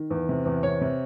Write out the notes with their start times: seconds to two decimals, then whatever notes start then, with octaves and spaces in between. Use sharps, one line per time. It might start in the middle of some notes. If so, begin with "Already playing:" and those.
Already playing: D#3
0.11 E2
0.29 C3
0.46 E2
0.63 C3 C#5
0.81 C3